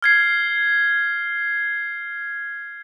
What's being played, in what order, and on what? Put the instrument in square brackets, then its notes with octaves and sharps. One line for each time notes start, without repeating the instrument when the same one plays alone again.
[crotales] F6 G#6 C7